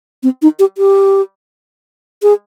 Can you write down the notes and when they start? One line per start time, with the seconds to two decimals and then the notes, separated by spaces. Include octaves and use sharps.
0.23 C4
0.42 D#4
0.59 G4
0.78 G4
2.23 G#4